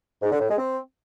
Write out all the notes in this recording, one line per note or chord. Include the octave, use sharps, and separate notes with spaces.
G#2
D3
A2
G#3
C4